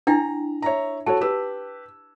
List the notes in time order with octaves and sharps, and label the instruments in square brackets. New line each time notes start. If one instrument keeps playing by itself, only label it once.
[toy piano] D4 E4 G5 [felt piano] A#5
[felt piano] C#5 E5 A#5
[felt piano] F#4 A4 C#5 [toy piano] A5
[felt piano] G4 B4 E6